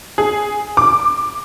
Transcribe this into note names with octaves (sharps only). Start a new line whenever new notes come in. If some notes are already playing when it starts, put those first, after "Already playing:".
G#4
D6